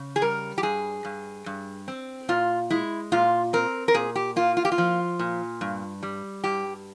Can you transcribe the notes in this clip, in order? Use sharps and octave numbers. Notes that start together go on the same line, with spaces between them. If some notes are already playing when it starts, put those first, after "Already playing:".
Already playing: C#3
G#4
G3 A#4
G4
G2 G#4
G2
G2
C4
A#2 F4
G#3 E4
A#2 F4
C4 A#4
A#4
A#2 G#4
G4
A#3 F4
F4
G4
F4
F3
A#2
G2
G3
G2 G4